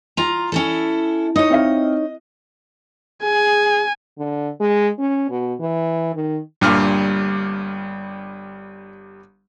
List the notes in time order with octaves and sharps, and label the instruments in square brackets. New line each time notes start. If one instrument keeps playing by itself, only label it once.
[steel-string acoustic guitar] F4 A#5
C#4 E4 A4
[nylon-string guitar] D#4 C#5 [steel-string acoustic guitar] D#5 [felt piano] D#6
[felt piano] C4 E5 F5
[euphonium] G#4 [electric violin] G#5
[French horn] D3
G#3
C#4
B2
E3
D#3
[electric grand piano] G1 G3 F6 [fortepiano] G2 A#2